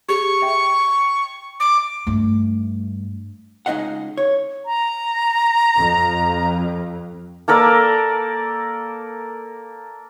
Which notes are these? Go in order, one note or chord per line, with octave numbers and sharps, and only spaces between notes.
G4 G#4 C#6
E5 G5
D6
G2 A3
C#2 G#3 D#4 D#5 F5 F#5
C#5
A#5
F2
A#3 A4 A#4 D5